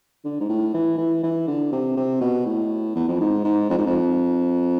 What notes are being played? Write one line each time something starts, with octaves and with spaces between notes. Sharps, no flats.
D3
G#2
A2
E3
E3
E3
D3
C3
C3
B2
A2
E2
F2
G#2
G#2
F2
G#2
F2